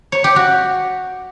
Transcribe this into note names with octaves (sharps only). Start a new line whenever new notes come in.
C#5
G4
F#4